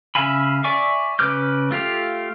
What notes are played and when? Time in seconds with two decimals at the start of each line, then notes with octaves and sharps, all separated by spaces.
0.15 C#3 E5 F5 G#5 B5
0.64 D5 E5 G#5 C#6 D6
1.19 C#3 B4 D6 F6 G6
1.71 A3 F4 G4 F5